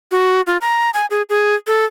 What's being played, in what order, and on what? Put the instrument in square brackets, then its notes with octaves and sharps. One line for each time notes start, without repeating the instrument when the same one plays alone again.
[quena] F#4
F4
A#5
G#5
G#4
G#4
A4